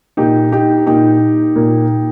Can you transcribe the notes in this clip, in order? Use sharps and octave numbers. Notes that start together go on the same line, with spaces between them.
A#2 D#4 G4
D#4 G4
A#2 D#4 G4
A#2